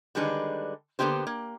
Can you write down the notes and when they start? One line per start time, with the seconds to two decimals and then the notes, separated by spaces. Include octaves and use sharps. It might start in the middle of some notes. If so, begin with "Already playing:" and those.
0.15 D3 D#3 G3 G#3 D4 B4
0.99 D3 A#3 B3 D#4 G4 C5
1.27 A#3